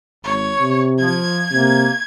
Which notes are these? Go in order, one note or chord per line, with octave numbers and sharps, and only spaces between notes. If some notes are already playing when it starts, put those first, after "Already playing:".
G#1 C#5
C3
F3 G#6
C3 A#3